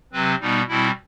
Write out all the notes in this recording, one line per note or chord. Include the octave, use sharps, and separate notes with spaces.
C3 F#3 C4 B4
B2 G3 B3 D#4
B2 G3 C4 E4